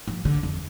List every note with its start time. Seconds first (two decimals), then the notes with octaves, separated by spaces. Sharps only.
0.08 F3
0.25 D3
0.43 F2